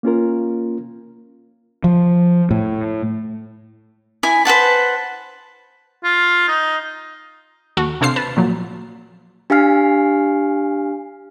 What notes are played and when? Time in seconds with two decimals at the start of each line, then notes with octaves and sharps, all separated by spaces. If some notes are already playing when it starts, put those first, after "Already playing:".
0.03 A#3 C#4 F4 A#4
1.84 F3
2.51 A2
4.23 E4 G#5
4.45 B4 C5 F#5 A5
6.04 F4
6.48 D#4
7.77 D#2 F#4 A4
8.01 C3 D4 A4 C5 F5 C7
8.16 B4 A5
8.37 A#2 F3 F#3
9.50 D4 G4 F5 G#5 F6 C7